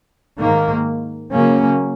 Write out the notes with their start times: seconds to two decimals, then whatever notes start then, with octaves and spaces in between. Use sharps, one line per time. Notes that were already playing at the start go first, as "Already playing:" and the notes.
0.38 G#2 D#3 A#3
1.32 C#3 F#3 A#3 C#4